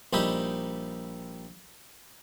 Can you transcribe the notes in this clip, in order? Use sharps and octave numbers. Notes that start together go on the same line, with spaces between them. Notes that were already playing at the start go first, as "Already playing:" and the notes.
A#1 G3 D#4 E4 G4